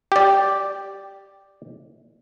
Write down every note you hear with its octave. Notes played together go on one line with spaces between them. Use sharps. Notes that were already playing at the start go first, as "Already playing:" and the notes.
G4 D5